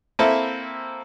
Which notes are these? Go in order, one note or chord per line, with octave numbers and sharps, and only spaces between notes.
A#3 C4 E4 A4 E5